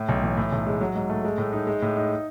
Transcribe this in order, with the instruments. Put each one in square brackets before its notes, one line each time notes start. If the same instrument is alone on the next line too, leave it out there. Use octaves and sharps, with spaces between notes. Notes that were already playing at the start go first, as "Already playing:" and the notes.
Already playing: [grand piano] A2
B1
E3
A2
B1
G#3
F#3
G#2
A3
G#3
A2
D#4
G#3
A2
D#4